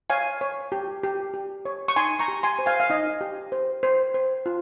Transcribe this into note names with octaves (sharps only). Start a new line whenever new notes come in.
C#5 F5 G#5
C#5
G4
G4
G4
C#5
C#6
D#4 G#5 C6
A#5 C#6
G4
G#5 C6
C5
F5 G#5
F5
D#4 D#5
G4
C5
C5
C5
F4